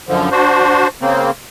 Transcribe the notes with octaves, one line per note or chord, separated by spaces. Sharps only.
F#2 D3 F3
D4 F#4 C5
C#3 A#3 C4